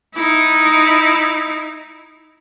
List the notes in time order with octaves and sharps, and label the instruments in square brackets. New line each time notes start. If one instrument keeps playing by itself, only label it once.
[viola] D#4 E4